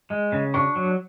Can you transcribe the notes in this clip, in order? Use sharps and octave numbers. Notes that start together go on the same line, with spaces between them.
G#3
C#3
D4 C#6
F#3